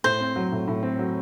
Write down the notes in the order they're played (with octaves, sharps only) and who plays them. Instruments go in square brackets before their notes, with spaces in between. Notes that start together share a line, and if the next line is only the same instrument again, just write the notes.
[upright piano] A2 [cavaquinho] C5
[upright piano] C4
F#3
A2
A2
C4
F#3